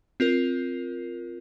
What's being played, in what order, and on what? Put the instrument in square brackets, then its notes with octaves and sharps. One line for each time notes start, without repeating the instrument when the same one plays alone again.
[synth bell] C4 F4 A#4